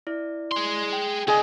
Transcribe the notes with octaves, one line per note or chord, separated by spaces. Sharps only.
E4 D5
G#4 C6
G5
D3 G#4 D#5